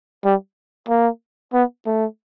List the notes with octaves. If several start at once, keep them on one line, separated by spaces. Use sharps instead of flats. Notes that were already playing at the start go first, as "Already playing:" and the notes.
G3
A#3
B3
A3